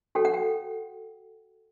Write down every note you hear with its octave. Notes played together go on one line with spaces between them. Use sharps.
F#4 A4 C#5 G5
F#5
G5